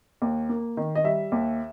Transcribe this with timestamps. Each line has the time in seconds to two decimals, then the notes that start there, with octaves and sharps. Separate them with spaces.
0.22 D#2
0.49 A#3
0.77 D#3
0.95 D#5
1.04 G3 E5
1.32 D#2